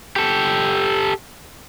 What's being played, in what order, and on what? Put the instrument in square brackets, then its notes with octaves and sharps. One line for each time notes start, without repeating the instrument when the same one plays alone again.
[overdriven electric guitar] G4 A4